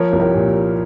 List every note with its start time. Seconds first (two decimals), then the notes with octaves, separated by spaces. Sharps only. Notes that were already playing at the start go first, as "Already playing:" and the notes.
Already playing: F3 A#4 C#5
0.12 C2
0.20 G4 A#4
0.34 A#2